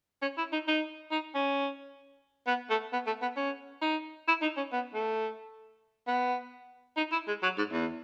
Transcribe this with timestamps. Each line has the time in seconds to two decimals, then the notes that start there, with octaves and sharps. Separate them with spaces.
0.22 C#4
0.38 E4
0.53 D#4
0.68 D#4
1.12 D#4
1.35 C#4
2.47 B3
2.70 A3
2.93 B3
3.07 A3
3.22 B3
3.37 C#4
3.82 D#4
4.28 E4
4.42 D#4
4.57 C#4
4.73 B3
4.94 A3
6.08 B3
6.97 D#4
7.12 E4
7.28 G#3
7.43 F#3
7.58 G#2
7.72 E2